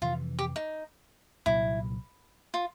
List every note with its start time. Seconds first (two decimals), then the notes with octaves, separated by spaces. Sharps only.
0.02 F2 C3 E3 F4
0.39 G4
0.56 D#4
1.46 C2 A#2 F#3 A#3 E4
2.54 F4